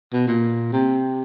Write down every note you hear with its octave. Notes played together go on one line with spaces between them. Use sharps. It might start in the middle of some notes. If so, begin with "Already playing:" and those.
B2
A#2
C3